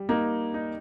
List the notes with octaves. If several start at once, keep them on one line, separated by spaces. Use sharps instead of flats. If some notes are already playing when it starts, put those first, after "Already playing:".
Already playing: G3
A#3 D#4
D#4